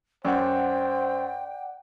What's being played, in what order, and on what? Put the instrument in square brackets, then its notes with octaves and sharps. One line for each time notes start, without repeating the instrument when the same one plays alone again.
[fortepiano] F#2 [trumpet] C5 [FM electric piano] D5 F#5 [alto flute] G5